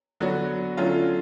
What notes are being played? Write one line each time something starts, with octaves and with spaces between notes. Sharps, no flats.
D3 F#3 B3 D4 F#4
D3 F#3 A3 C#4 F4